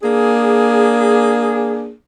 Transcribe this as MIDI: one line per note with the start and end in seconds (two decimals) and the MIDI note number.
0.03 1.93 58
0.03 1.93 62
0.03 1.93 68